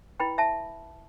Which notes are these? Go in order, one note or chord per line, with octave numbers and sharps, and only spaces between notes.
E4 B4 G5 B5
E5 A5